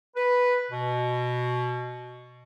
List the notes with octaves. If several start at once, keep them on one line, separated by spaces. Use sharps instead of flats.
B4
B2